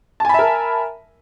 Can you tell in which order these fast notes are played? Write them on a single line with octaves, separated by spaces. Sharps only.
A5 G#5 B5 E5 A#4